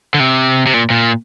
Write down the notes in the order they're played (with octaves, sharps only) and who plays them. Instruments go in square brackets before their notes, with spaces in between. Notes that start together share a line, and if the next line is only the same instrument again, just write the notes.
[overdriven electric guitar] D3
C3
C3
A#2
A#2